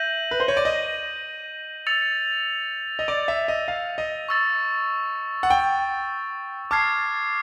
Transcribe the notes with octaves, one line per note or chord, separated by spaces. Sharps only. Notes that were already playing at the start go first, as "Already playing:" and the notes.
Already playing: E5 G6 A#6 D#7 F#7
B4
C5
C#5
D5
D#5
E6 A6 C#7 F7
D#5
D5
E5
D#5
F5
D#5
C#6 E6 A6
F#5
G5
A5 D6 F6 G#6 C7